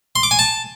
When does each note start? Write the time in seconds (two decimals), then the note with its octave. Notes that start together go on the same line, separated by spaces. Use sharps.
0.16 C6
0.23 D6
0.31 G#5
0.39 A5